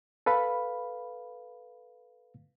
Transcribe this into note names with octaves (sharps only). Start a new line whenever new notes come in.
A4 B4 F5 B5